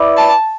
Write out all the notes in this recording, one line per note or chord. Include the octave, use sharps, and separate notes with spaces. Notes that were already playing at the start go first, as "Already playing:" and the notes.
Already playing: E4 B4 D5
A5